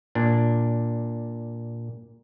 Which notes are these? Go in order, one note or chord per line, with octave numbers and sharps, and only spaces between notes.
A#2 D4